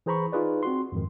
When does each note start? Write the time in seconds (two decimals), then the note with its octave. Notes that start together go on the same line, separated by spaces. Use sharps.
0.06 E3 G#4 C5 A#5 B5 C#6
0.32 D#4 F4 G#4 B4 D5
0.63 C4 F#4 C6
0.92 F2 G#2 D#3